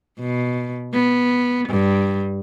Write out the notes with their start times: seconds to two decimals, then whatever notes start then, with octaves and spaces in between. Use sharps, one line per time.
0.19 B2
0.94 B3
1.69 G2